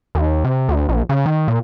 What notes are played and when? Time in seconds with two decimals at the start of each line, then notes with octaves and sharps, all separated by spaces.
0.15 D#2
0.44 C3
0.69 D2
0.89 A#1
1.09 C#3
1.26 D#3
1.48 A#2